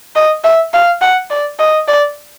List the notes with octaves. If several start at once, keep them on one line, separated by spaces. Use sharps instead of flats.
D#5
E5
F5
F#5
D5
D#5
D5